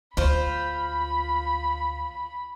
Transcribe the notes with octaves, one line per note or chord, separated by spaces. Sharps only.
D2 F4 C5 B5